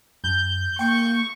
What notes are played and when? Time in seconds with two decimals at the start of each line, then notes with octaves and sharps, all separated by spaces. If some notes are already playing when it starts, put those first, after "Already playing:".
0.24 F#2 G6
0.79 A#3 G5 C#6